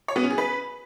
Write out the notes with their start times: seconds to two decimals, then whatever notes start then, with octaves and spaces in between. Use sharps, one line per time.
0.08 C#5
0.16 B3
0.23 C#4
0.31 G#4
0.38 B4